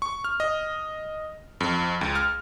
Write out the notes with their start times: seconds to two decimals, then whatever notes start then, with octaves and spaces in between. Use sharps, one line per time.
0.02 C#6
0.24 F6
0.40 D#5
1.60 F2
2.01 C#2
2.15 F6